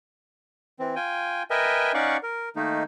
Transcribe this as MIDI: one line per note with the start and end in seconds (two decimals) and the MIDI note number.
0.80 0.95 52
0.80 0.95 60
0.96 1.43 65
0.96 1.43 79
0.96 1.43 80
1.50 1.92 70
1.50 1.92 71
1.50 1.92 75
1.50 1.92 76
1.50 1.92 79
1.50 1.92 80
1.94 2.17 61
1.94 2.17 63
1.94 2.17 74
1.94 2.17 77
1.94 2.17 78
1.94 2.17 85
2.23 2.49 70
2.56 2.83 51
2.56 2.83 57
2.56 2.83 58
2.56 2.83 63